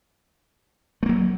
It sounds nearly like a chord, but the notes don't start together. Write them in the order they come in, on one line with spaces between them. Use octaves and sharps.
A3 A#3 F#3